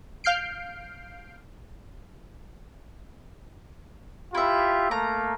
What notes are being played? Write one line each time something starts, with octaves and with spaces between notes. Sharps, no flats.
F5 F6 G6 C7 D7
E4 F4 G4 E5
A3 A#3 A#5